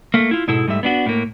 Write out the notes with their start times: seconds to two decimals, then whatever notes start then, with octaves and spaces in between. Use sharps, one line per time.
0.14 A3 A#3
0.31 E4 F4
0.48 G#2 B2 E4 G#4 A4
0.67 G#2 G3 A3 E5
0.83 B3 D4 F#4
1.06 A2 A#3